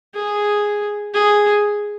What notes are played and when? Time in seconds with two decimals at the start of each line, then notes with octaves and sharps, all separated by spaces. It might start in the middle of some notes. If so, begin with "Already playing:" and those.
0.15 G#4
1.14 G#4